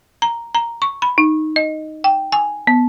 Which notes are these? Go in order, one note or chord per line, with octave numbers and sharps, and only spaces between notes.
A#5
A#5
C#6
B5
D#4
D#5
G5
G#5
B3